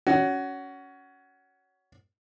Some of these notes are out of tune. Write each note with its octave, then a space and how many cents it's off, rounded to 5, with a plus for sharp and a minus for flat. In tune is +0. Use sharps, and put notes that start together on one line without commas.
C#4 +15 F#4 +15